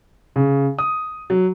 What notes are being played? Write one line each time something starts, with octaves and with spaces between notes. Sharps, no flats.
C#3
D#6
F#3